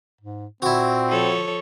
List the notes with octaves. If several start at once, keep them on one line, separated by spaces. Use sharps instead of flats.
G#2
A#2 C4 E4 F#4
F3 A4 C#5